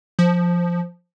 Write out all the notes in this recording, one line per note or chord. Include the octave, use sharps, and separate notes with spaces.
F3